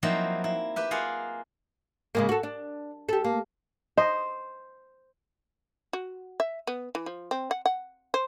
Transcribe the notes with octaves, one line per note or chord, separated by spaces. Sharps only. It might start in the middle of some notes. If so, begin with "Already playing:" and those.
F3 F#3 A#3 C4 D#4 E4
E4
G4 B4 E5
A#3 F4 G#4 F#5
C#3 G#3 A#3
F#4 A4
D4
G4 A4
A#3
C5 D#5
F#4
E5
B3
E3
F3
C4
F#5
F#5
C5